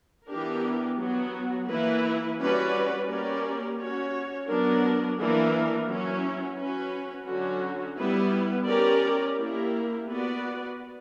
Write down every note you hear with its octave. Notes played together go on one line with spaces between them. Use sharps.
E3 B3 D4 G4 A#4
F#3 B3 F#4
E3 A#3 E4 B4
G3 C#4 F#4 B4 D5
A#3 C#4 G4 A#4 D5
C#4 F#4 C#5
F#3 B3 D4 A#4
E3 A#3 D4 A#4
F#3 C#4 E4
C#4 F#4 B4
D3 F#3 C#4 F#4
G3 B3 E4 B4
C#4 G4 A#4 D5
A#3 E4 G4 A#4
B3 F#4 B4 D5